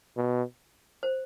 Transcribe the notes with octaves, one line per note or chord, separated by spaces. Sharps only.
B2
C5